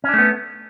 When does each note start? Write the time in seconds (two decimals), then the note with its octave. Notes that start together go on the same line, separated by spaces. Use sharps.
0.04 C#4
0.09 D4
0.13 A3
0.18 B3